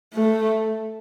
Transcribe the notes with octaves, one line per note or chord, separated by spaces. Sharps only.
A3